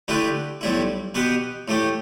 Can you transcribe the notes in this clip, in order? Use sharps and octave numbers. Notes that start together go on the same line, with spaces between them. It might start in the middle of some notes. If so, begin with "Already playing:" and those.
D3 A3 E4 G4 B4
B1 A2 G3 E4
B2 B3 G4 B4
A2 A3 G4